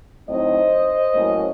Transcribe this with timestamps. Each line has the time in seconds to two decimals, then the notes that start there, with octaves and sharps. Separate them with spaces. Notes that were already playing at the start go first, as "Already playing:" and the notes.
0.29 A2 F#3 C4 D#4 C5 D#5
1.15 A2 F#3 A#3 C#4